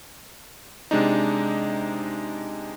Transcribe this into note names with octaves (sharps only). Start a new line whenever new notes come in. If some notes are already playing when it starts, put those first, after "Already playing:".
C3 G#3 D4 D#4